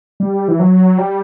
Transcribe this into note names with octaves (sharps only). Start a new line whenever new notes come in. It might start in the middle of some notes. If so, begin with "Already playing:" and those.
G3
E3
F#3
G3